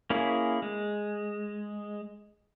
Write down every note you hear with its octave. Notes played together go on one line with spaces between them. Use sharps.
A#3 C#4 E4 G#4
G#3